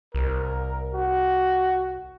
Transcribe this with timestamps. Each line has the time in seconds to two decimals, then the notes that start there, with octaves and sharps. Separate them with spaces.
0.15 C2 A#4
0.94 F#4